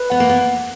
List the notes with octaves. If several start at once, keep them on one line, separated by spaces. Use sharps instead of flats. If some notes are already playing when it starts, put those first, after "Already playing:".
Already playing: B4
B3 F#5
A#3
B3